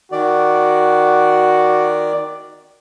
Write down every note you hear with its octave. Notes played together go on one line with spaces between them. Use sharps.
D#3 F#4 D5